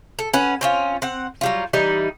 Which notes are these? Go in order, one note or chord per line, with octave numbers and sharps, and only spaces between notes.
A4
C#4 B4 F#5
C4 C#4 F4
C4 F#5
F#3 G3 F4
E3 G3 D#4